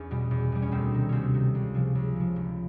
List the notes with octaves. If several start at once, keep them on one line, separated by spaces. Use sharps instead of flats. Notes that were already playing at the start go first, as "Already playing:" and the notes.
Already playing: E2 C#4
B2 G3
E2
B2 G3
C#4
D2 C4
C3 D#3
D2 C4 C#4
C3 D#3
C#2
C#3 F3
C#2
C#3 F3
F1